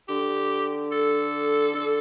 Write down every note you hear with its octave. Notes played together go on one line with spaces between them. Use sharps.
D3 G4
A4
D3